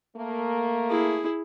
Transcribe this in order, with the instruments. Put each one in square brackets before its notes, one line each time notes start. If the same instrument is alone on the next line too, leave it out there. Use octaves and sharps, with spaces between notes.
[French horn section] A3 A#3
[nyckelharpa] E4 G#4